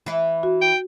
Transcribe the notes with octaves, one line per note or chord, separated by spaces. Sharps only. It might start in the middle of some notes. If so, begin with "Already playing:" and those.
E3 E4
F#4
G5